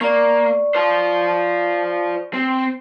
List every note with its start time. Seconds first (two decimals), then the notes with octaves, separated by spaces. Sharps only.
0.01 A#3 D5 C#6
0.75 F4 C5
2.33 C4